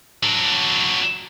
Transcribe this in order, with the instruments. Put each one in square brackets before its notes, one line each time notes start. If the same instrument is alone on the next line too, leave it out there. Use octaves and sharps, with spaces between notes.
[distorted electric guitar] F#3 D4